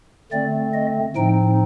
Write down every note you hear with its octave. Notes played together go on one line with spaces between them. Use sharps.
D3 A3 C4 D5
D#5
A2 F3 C4 D#4 G5